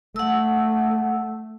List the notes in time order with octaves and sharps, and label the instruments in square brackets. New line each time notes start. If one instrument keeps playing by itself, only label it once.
[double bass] A3 [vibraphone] F#5 E6